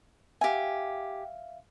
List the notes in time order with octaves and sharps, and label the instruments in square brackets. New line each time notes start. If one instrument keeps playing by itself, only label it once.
[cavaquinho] G4 G#5 [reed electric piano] E5 F5